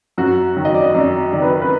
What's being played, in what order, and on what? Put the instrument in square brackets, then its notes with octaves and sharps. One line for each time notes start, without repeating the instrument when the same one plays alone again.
[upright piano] F#2 F#4
D#3 F#3
D#5
D5
D#5
F#2 D5
D#3 F#3 D5
B4
A#4
B4